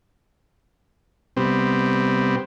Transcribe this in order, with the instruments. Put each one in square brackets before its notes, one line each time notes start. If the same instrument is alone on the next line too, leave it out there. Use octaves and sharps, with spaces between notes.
[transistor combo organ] C3 G3 B3 C4